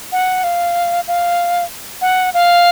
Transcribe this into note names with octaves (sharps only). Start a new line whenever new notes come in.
F#5
F5
F5
F#5
F5